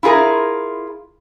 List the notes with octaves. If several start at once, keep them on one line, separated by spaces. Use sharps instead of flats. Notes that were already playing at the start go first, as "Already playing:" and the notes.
E4 F4 G#4 A#4